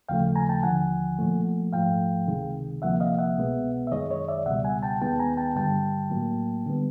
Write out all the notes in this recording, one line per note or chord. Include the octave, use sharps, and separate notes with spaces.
D#2 C#3 F3 A3 F5 G5
G#5 A#5
G5 A5
D#2 D3 F3 F#5 G#5
A#2 F3 A3
G#2 F3 A3 F5 G5
C#2 C3 D#3 G#3
D2 C3 F3 A#3 E5 F#5
D#5 F5
E5 F#5
C2 B2 G#3 B3
E5
F#2 D#3 G#3 C#5 D#5
C#5 D#5
D5 E5
C#2 B2 G3 E5 F#5
F#5 G#5
G5 A5
D#2 D#3 G#3 B3 G5 A5
G#5 A#5
G5 A5
G2 D3 G3 G5 A5
A2 F#3 A#3
D3 G3 B3